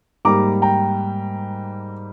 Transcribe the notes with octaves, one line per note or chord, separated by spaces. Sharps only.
G#2 G3 A#3 A#5 D6
G5 A#5